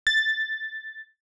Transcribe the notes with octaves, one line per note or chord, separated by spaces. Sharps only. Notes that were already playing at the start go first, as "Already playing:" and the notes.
A6